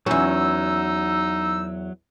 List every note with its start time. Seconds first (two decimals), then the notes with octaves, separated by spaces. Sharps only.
0.06 E2 F#3 C#4 D#4 E6